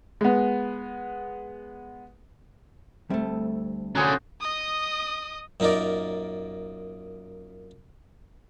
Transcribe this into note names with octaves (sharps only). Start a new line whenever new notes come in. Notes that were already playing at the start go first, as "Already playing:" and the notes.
G#3 B3
D2 G3 A3 C4 E5
D3 C#4 F#4 G#4 C5 A#5
D#5 D#6
F#2 A#2 D#4 A#4 D5